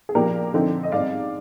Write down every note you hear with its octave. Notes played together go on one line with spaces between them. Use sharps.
G#4
A#2 F3 A#3 D4 G4 A#4
D3 F3 C4 D#4
D#5
G#2 G3 C4 D#4 D5 F5